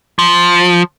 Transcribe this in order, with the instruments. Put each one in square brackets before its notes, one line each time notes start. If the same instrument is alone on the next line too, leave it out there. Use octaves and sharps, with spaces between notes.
[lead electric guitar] F3